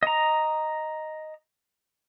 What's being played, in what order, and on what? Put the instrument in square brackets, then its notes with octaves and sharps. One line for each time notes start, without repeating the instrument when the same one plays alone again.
[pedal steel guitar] D#5 A#5